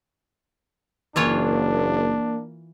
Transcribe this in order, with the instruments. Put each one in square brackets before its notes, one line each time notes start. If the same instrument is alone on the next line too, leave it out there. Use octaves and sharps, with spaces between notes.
[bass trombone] F#1 [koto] E3 F4 C#5 [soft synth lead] A#3 [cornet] D4